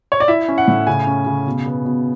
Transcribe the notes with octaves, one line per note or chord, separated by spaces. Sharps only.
C#5
D5
E4 E5
C#4
F#5
A2
C#3 G#5
C#4
C#3
B2
B3
B2